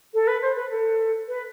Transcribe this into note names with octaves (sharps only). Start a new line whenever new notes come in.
A4
B4
C5
B4
A4
B4